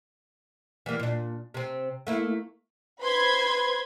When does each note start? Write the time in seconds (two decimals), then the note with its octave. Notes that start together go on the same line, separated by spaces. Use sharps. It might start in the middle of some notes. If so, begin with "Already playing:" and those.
0.86 E3 G3 A#3
1.00 A#2 D4
1.54 C3 C4
2.07 A3 A#3 E4
3.00 B4 C5 B5 C6 G#6